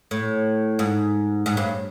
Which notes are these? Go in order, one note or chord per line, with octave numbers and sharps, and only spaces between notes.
A2
G#2
G#2
G2